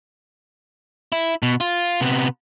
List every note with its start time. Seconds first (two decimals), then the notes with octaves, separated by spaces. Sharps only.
1.12 E4
1.43 B2
1.61 F4
2.01 C3 B3